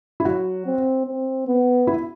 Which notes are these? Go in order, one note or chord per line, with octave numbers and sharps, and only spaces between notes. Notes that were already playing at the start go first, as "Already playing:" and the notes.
E4
F#3 F#4
C4
C4
B3
E4